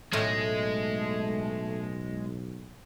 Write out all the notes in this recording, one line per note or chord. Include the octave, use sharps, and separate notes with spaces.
B1 A2 G#3 A3 D#5